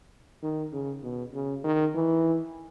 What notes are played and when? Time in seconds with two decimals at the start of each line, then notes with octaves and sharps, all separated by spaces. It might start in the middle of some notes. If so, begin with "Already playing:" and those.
0.43 D#3
0.72 C#3
1.03 B2
1.33 C#3
1.64 D#3
1.94 E3